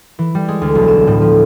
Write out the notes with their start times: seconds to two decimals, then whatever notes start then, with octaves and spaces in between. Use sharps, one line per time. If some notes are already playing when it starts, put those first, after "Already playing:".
0.19 E3
0.35 G3
0.48 G#3
0.61 D2
0.75 B1
0.88 E7
1.07 A2
1.21 F3